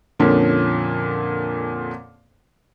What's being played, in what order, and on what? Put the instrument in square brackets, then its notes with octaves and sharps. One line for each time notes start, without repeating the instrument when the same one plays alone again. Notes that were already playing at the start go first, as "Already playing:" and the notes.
[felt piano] F2 A#2 D3 F3 C#4